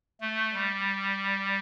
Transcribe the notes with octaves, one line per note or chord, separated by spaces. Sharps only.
A3
G3